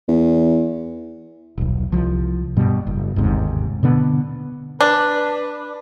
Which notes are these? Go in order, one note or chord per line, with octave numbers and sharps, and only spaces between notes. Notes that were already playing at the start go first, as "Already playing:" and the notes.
E2
D#1 B1
C2 F3
G2 B2 G3
F#1
G1 D#2 G#2 C3
B2 D3 B3
D4 B4